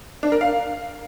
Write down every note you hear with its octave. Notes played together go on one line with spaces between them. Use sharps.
D4
A#4
F5